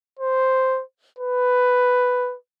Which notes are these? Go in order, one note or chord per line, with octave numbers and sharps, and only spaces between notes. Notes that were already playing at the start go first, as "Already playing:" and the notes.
C5
B4